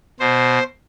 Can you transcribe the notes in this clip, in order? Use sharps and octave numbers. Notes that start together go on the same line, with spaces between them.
B2 C5